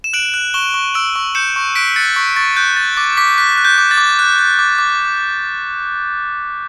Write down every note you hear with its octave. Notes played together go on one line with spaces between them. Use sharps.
E7
F#6 D7 F#7
F#6
C#6 E7 G7
C#6
E6 D7 F#7
C#6
G6 C#7 E7
C#6
F#6 B6 D7
F#6 A6 C#7
C#6 B6
C#6 A6
F#6 G6
F#6 A6
D6 A6
D6 B6
F#6 B6
F#6
G6
D6
A6
D6
F#6
F#6
D6
D6